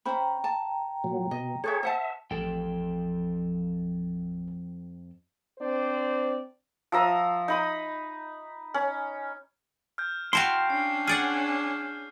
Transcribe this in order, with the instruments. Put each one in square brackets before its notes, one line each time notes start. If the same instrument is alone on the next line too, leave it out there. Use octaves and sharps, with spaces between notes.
[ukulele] C#4 C5 B5 [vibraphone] G5 A#5
[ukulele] A5
[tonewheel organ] A#2 F#3
[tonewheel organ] B2 [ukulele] D#5
[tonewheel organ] G#4 C#5 [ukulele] A4 B4 E5
[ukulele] C5 F#5 A5 [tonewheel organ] E5
[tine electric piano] A1 [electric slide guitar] F2 A4 G5
[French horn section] C4 D4 C5 D5
[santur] F3 E5 A#5 D#6
D#4 B5 D#6
C#4
[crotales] F6 G6
[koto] E4 F#4 F5 [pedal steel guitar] G5 A5 C6
[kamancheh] C#4 D4 [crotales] C7
[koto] G#4 D5 F#5 [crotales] F6